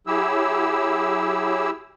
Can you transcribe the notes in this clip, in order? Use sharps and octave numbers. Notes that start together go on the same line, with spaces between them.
F#3 E4 G4 G#4 E6